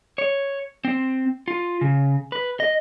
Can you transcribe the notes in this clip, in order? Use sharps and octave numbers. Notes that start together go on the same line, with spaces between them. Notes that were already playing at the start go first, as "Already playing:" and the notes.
C#5
C4
F4
C#3
B4
D#5